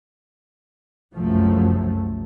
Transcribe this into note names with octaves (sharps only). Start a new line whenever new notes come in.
F#1 C2 F#2 F3 F#3 A3